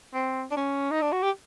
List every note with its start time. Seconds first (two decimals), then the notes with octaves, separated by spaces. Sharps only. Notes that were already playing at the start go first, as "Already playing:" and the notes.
0.13 C4
0.51 D4
0.56 C#4
0.91 D#4
1.02 D4
1.12 F#4
1.23 G4